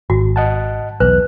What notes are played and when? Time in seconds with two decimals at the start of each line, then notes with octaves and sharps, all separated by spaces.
0.10 G#1 F#4
0.36 D#5 F#5 A5
1.00 B1 E2 B4 F#6